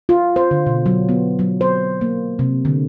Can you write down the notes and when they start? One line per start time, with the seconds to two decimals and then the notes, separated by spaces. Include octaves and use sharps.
0.09 F4
0.36 C5
0.51 D3
0.66 B2
0.86 F#3
1.09 B3
1.39 F#3
1.61 C5
2.01 A#3
2.39 C3
2.65 D3